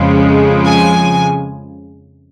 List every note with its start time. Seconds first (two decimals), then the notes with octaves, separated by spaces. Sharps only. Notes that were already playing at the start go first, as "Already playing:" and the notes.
Already playing: F2 C#3 F3 G#3
0.66 G#5